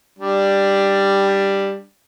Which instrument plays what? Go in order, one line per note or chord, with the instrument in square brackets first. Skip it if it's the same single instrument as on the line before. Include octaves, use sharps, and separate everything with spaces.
[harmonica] G3 D4